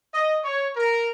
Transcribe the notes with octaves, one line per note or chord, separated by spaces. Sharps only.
D#5
C#5
A#4